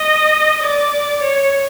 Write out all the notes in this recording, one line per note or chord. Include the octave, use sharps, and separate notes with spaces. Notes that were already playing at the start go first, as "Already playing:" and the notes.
Already playing: D#5
D5
C#5